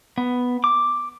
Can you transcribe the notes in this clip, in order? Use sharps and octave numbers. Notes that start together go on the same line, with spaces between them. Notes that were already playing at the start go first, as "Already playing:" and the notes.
B3
D6